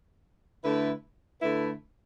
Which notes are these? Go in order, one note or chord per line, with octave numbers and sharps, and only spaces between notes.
D3 A3 E4 B4
D3 A3 E4 B4